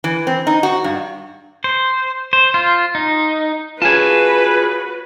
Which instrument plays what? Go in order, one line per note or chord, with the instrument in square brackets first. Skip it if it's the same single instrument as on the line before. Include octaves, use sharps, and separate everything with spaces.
[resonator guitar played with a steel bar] E3
C4
D#4
F#4
G2
[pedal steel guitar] C5
C5
F4
D#4
[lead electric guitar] F4 G#4 [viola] F#4 B4 [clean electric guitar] C#5 G#5 A5